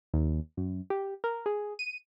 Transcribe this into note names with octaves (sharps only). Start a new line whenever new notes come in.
D#2
F#2
G4
A#4
G#4
D#7